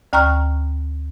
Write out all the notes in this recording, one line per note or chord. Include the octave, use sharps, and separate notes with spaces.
D2 G5 A#5 C#6 F6 F#6